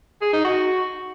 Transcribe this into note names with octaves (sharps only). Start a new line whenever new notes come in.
G#4
D#4
F#4